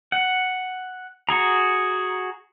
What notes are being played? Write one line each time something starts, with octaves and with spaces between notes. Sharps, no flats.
F#5
F#4 G#4 A#5